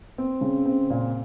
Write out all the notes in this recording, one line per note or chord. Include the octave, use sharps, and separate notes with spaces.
C4
C#3
C4
A#2